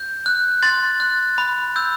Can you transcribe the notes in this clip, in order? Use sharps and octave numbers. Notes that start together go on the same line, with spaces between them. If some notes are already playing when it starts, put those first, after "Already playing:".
Already playing: G6
F#6
C6 A6
F#6
B5
E6 G6